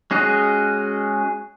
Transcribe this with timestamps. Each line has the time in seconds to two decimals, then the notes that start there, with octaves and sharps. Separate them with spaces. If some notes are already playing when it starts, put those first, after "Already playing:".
0.11 G#3 C#4 F#4 G#4 D#5